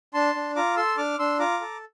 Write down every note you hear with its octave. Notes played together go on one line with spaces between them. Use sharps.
D4 A5 C6
D4
F4 A#5 D6
A4 C6 E6
D4 D6 F6
D4 C6 E6
F4 A#5 D6
A4